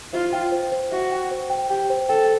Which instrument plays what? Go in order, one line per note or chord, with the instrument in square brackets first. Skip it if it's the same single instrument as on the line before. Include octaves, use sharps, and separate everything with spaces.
[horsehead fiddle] F4 [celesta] C5
[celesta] G5
C5
C5
[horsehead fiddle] F#4 [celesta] E5
[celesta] G5
C5
G5
[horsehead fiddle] G4 [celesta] G5
[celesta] C5
[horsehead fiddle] A4 [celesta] G5